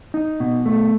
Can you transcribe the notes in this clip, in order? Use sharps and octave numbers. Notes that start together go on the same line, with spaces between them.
D#4
B2
A3